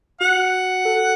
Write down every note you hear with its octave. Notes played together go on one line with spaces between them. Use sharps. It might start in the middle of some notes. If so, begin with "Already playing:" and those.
F#4 F#5
A4